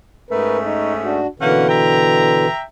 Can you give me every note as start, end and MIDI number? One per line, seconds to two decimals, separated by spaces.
0.31 1.21 44
0.31 1.21 57
0.31 1.21 61
0.31 0.57 70
0.31 0.57 71
0.63 0.93 63
1.04 1.27 62
1.04 1.27 66
1.40 2.46 47
1.40 2.46 50
1.40 2.46 52
1.40 1.67 58
1.40 1.67 61
1.40 1.67 78
1.69 2.62 76
1.69 2.62 79
1.69 2.62 82